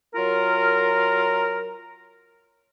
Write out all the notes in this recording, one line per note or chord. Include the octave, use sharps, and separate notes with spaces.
F#3 F4 A#4